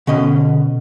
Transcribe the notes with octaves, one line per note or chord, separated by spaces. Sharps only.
B2 D3 C#4 D#5